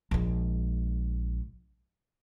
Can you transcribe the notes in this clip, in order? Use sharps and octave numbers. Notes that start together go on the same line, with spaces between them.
A#1 G#3